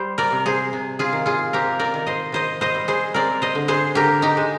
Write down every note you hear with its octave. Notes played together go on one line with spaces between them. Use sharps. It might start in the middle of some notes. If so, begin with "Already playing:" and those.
Already playing: G3 C5
A#4 D5
C3
G#4 C5
C3
F4 G#4
D#3
F4 G#4
C4 G4 A#4
A#4 D5
D#3
C5 D#5
D#3 C5 D#5
C5 D#5
G3
G#4 C5
C4 A#4 D5
C5 D#5
D3
G#4 C5
D3 G4 A#4
D#4 G4
G#3